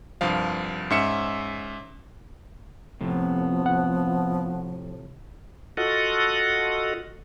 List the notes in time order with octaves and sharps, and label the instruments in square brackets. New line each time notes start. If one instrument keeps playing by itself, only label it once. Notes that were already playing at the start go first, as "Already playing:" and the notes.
[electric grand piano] C2 G2 F3 F5
G#2 C#4 E5 E6 C#7 E7
[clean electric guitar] F2 A2 C3 [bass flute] F3 [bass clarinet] B3
[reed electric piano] F#5
[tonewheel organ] F4 F#4 A4 D#5 F#5